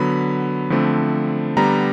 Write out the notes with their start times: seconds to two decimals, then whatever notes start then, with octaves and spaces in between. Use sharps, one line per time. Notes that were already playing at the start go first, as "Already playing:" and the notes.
Already playing: D3 F#3 B3 B5
0.70 D3 F3 A3 C4
1.57 D3 G3 B3 A#5